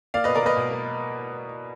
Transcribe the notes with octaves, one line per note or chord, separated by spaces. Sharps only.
A#3 D5 F5
B2 B4 D#5
A#4 D5
A#3 B4 D#5
B2
A#3